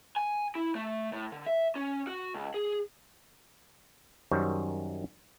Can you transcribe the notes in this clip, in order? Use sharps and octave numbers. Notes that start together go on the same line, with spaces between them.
G#5
E4
A3
A2
D3
E5
C#4
F#4
C#2
G#4
F#2 D#3 G3 C5 C#5